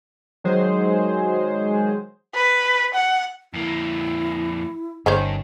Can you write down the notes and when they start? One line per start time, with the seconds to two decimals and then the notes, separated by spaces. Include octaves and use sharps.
0.44 D#3 F#3 G#3 G#4 C5
2.35 B4
2.94 F#5
3.54 F2 A#3 E4
5.06 G1 G2 D#3 C#4 C5